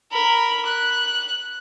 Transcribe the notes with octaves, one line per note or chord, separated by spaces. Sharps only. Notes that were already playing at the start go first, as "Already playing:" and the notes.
A#4 B5
F#6